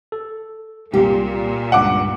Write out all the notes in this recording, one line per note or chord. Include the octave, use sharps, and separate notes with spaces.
A4
C2 A#2 G4
C#2 G2 F#5 D6